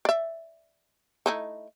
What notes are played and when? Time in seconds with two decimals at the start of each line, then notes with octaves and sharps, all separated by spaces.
0.05 D5 E5
1.26 A3 D#4 E4